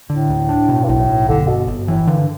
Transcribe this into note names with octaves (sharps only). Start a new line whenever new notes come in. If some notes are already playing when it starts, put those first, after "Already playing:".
A2 D3
D2
D4
B2
G2
B1 A2
B1
G1 D3
G1 B2
G1
A2 E3
G2 D3